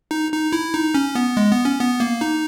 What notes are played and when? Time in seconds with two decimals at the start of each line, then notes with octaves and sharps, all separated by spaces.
0.11 D#4
0.32 D#4
0.53 E4
0.74 D#4
0.95 C#4
1.15 B3
1.37 G#3
1.51 B3
1.65 C#4
1.80 B3
2.00 A#3
2.21 D#4